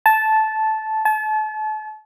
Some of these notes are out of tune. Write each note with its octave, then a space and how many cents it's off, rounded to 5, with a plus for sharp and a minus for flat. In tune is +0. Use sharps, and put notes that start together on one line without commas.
A5 -10
A5 -35